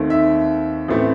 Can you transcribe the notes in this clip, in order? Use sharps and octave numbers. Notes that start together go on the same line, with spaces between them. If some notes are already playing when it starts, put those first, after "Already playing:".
Already playing: D#2 D#3 A3 C4
E5
A1 E3 A3 C4